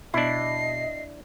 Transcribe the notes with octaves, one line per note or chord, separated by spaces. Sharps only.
B2 D4 E4 D#5 C7